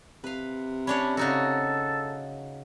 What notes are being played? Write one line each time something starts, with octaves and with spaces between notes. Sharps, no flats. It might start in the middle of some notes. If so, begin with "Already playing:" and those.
C3 B4 F5
C#4 D4 C#5 B5
C#3 D#4 F#4 A4